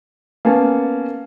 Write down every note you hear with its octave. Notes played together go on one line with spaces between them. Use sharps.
A#3 B3 C#4 A5